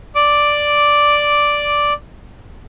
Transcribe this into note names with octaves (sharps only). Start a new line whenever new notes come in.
D5 D6